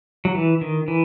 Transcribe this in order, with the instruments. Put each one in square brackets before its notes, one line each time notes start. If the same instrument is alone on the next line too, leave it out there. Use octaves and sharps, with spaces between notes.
[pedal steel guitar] F#3
E3
D#3
E3